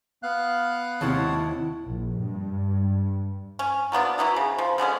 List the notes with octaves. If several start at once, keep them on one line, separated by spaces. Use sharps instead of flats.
B3 F5 F#6
D#2 C3 E4 C#5 F#5 A5
A#1
G2
C#4
F#3 A#3 B3 D4
E3 F#3 B3 E4
C#3
F3
D3 G#3 B3 C#4